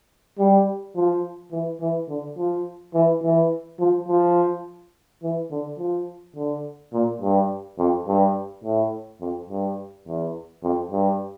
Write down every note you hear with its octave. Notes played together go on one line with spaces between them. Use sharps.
G3
F3
E3
E3
D3
F3
E3
E3
F3
F3
E3
D3
F3
D3
A#2
G2
F2
G2
A2
F2
G2
E2
F2
G2